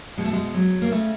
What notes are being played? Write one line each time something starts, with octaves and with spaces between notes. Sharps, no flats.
B2 G#3
A3
G#3
F#3
A#3
C#3 A3